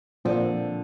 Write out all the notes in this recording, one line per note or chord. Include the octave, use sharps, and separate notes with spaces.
A#2 D3 F3 C4